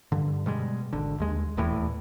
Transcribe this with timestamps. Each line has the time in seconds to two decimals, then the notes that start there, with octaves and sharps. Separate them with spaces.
0.12 G2 D3
0.46 B2 G3 G#3
0.93 G#1 D3
1.20 D#2 G#3
1.57 D#1 E2 A2 E3